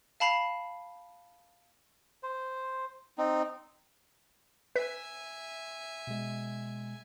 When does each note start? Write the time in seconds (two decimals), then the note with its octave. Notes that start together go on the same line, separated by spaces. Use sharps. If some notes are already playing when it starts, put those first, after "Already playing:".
0.20 F5 A5 B5 C7 F7
2.23 C5
3.18 C4 D#4
4.76 B4 E5 G#5 B6
6.07 B2 G#3